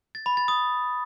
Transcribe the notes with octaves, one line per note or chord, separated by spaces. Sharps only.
A6
B5
A6
D#6